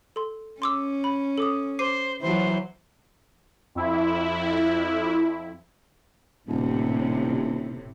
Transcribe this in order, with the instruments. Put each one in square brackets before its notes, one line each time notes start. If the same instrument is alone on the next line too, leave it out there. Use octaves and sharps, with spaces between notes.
[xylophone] A4 C6
[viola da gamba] C#4 [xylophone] C6 D6 E6
[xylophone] B5
A4 D6 D#6
[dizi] C5 [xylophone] D6 C7 D#7
[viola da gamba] E3 F#3 [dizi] C5
[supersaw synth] F2 E4
[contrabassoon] D#1 [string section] A2 C3